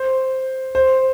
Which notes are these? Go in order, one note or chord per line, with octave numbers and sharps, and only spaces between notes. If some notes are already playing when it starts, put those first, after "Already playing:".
Already playing: C5
C5